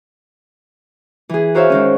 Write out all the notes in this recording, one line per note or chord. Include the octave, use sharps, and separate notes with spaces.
E3 G#4
F#4 A#4 C5 C#5 E5 F5
G#2 D#3 C#4